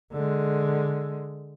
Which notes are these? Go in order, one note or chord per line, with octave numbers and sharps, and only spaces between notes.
D3 G#3